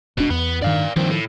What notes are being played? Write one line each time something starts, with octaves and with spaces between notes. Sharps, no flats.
E1 B2 D4
E2 B3
G2 D#3 D5 F5
G2 D#3 F3 C4
A2